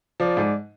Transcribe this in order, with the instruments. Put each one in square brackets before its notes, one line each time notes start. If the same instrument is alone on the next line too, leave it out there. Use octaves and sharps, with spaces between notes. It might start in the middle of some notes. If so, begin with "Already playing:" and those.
[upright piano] F3 [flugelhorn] D5
[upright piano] G#2